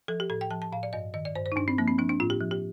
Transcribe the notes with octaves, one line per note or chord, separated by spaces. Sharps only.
F3 A4
G4
A2 A4
G5
F3 A5
A5
A2 F5
D5
G2 D#5
D#3 D#5
D5
G2 C5
C5
D#4
G2 D4
C4
F3 A#3
C4
F3 D4
D4
A2 F4
G4
F3
G4